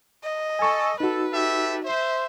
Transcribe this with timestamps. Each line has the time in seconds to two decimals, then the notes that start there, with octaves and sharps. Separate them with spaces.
0.23 D#5
0.59 A4 G#5 C#6
1.00 D#4 F#4 A4 B4
1.32 G4 A4 E5
1.85 C5 E5